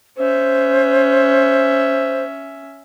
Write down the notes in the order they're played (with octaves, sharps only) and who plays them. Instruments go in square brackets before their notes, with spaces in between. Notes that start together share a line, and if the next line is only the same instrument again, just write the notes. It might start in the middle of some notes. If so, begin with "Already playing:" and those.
[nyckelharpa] C#4 E5 [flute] C5